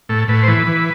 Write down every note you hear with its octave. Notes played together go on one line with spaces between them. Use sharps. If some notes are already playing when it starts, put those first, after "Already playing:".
A2 A4
A2 B4
C5
E3 B4
E3